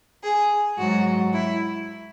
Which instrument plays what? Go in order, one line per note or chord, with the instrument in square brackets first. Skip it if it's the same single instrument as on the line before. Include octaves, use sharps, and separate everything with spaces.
[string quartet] G#4
G#2 F#3 F#4
E4